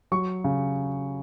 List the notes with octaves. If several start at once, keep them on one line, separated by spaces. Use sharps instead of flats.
F#3 C#6
C#3